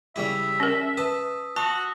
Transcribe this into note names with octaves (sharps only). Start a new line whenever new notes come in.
C#3 G3 E4 E5 E6 B6
C#4 A#4
B4 A5 D#6
F#4 A5 C#6 D#6 F#6